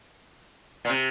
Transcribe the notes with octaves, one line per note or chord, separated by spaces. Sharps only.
A#2
C3